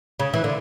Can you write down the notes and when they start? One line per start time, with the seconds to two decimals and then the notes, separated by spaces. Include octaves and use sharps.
0.19 C#3
0.34 E3
0.44 D3